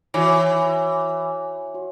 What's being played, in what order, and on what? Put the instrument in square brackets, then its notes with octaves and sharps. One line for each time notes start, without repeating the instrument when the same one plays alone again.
[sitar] E3 [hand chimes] F#4 C#5 G#5
[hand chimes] F#4 C#5